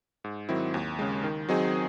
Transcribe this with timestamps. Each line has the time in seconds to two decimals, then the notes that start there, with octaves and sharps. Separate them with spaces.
0.24 G#2
0.49 D#3 F#3 C4 E4
0.74 D#2
0.99 C#3 G#3
1.24 D#3
1.49 F#3 C4 D#4 G#4